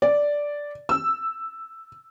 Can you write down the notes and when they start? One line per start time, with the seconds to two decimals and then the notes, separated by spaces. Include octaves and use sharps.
0.02 D5
0.89 E6